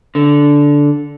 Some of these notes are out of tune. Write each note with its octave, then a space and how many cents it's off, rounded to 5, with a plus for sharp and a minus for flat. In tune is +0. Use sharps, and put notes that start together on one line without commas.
D3 -10